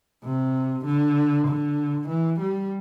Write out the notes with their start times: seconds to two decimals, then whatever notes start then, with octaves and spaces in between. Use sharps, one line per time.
0.24 C3
0.85 D3
1.47 D3
2.09 E3
2.40 G3